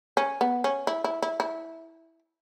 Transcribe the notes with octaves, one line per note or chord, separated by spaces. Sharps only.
C#4
B3
C#4
E4
E4
E4
E4